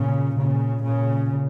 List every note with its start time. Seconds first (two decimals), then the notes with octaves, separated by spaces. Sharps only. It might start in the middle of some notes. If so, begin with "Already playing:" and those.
Already playing: A#2 C#3
0.37 A#2 C#3
0.83 A#2 C#3